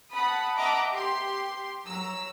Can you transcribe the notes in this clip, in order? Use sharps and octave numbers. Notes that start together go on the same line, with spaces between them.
F#5 A5 B5 D#6
D#5 E5 F#5 A5 A#5 D6
G4 C6
F#3 A#5 E6